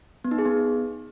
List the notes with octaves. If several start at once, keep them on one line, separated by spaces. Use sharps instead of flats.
B3
D#4
G#4
B3